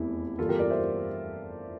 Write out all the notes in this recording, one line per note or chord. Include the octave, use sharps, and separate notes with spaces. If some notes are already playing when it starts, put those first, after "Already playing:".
Already playing: F1 E2 E3 A#3 E4
G1 G2 E3 A#3 F4 A4
G4 A#4
A#4 D5
C5 E5